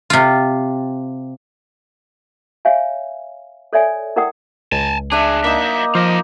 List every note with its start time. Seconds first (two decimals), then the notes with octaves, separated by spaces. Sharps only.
0.10 C3 F4
2.65 C#5 E5 F5 G#5
3.73 A4 C#5 D5 E5 G#5
4.16 E4 A#4 D5 F#5 G5 D#6
4.72 C#2 G#5 A5
5.12 A3 D4 G#4 E5
5.44 F#3 A#3 D#4 E5
5.95 F3 F4 D#5